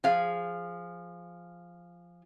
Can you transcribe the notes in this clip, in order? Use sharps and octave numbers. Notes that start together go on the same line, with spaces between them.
F3 G#4 F5